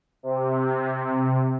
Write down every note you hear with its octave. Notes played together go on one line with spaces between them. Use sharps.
C3